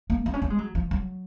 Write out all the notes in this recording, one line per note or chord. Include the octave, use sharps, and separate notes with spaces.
A#3
C4
C#4
C4
G#3
F#3
F3
F#3